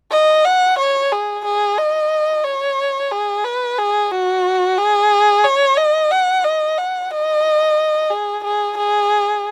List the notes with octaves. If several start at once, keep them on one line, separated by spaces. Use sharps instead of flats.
D#5
F#5
C#5
G#4
G#4
D#5
C#5
G#4
B4
G#4
F#4
G#4
C#5
D#5
F#5
D#5
F#5
D#5
G#4
G#4
G#4